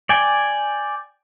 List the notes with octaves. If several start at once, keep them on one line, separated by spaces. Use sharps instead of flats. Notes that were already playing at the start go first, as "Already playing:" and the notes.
D5 G5 G#5